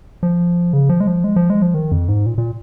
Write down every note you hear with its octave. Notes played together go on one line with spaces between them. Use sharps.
F3
C#3
F3
G#3
F3
G#3
F3
G#3
F3
D#3
F2
G#2
A#2
A#2